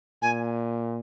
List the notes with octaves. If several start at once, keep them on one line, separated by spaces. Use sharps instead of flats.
A#2 G#5